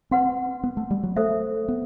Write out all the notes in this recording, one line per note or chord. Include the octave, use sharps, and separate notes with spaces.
C4 B4 F#5 C6
B3
A3
G3
F#3
A3 A4 C5 E5
B3